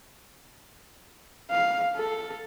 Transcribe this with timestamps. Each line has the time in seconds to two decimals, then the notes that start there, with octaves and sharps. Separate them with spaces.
1.51 F5
1.96 A4